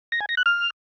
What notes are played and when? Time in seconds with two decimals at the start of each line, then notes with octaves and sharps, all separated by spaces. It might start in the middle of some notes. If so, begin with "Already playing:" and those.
0.12 A#6
0.21 G#5
0.29 A#6
0.37 F#6
0.46 F6